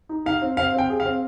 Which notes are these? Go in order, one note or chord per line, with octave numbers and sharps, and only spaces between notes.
D#4
D#4 F5
C4
C4 F5
C4 G5
G#4
F5
C4